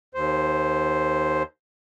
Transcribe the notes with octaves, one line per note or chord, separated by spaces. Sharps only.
D#2 C5